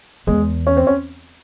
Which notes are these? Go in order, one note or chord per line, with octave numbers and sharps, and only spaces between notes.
E2 G#3
C#4
C4
C#4